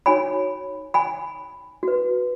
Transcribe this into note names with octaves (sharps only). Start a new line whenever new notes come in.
D#4 F#4 C#5 G#5 B5
G#5 B5
F#4 B4